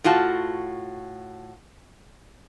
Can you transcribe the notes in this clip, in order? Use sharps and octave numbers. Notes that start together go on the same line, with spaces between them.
A2 F4 F#4 A5